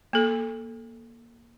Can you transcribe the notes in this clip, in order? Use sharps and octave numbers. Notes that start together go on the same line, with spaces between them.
A#3 A4